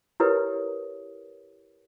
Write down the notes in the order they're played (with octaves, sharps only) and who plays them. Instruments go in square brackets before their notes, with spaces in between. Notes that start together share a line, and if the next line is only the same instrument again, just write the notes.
[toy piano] E4 G4 A#4 B4 C#5 D#6